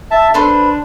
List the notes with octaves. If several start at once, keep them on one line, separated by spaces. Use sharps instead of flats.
E5 A5
D4 A4 B4 C5